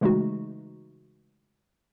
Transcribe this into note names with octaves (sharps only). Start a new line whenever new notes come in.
C#3 E3 G#3 A3 D#4 F#4